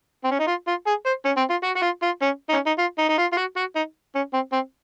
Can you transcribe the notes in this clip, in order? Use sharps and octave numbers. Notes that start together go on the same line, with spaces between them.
C4
C#4
D#4
F4
F4
G#4
C5
C#4
C4
F4
F#4
F#4
F4
F4
C#4
D#4
C#4
D#4
F4
D#4
D#4
F4
F4
F#4
F#4
D#4
C#4
C4
C4